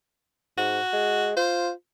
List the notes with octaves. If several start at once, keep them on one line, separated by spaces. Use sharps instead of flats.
G#2 F#4
G#3
F4 C5